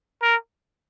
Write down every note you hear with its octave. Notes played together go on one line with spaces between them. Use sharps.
A#4